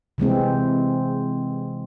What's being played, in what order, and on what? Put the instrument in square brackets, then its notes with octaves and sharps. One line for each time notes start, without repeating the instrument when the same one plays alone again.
[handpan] C3 E3 G#3 C4